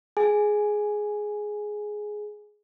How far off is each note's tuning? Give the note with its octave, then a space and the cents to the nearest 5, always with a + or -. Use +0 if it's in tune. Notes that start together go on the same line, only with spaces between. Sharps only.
G#4 +10 G#5 +0